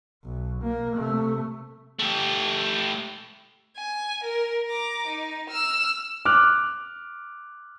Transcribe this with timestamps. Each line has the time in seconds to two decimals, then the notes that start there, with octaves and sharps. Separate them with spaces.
0.24 B1
0.62 A#3
0.95 C3 A3
1.99 A3 G4
3.77 G#5
4.24 A#4
4.67 A#5 D6
5.07 D#4
5.49 E6 F6
6.25 D6 F6 F#6